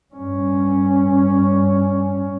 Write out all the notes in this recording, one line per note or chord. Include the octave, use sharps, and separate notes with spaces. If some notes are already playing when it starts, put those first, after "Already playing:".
G2 C#4